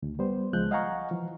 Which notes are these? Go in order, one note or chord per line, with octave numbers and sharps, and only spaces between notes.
D2
G3 B3 C5
C#2 F3 G#3 F#6 G6
D#5 F5 F#5 G#5 A#5 C#6
E3 F3